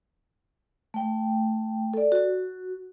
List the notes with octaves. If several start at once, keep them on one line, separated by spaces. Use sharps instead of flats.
A3 G5
A4 D5
F#4